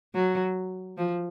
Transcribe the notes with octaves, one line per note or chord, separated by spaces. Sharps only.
F#3
F3